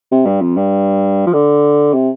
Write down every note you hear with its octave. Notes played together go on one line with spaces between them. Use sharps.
C3
G2
F2
G2
F3
D3
C3